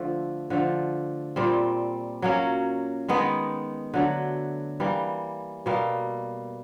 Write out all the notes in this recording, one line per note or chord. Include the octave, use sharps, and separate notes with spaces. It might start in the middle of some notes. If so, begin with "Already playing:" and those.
Already playing: D3 F3 A3
D3 F3 A3
A#2 G3 C4
F#3 A#3 C#4
D#3 G#3 B3 D#4
D3 F#3 A3
E3 G3 A#3
B2 G3 A#3